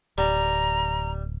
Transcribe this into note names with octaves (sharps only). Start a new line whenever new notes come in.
D1 G3 A#5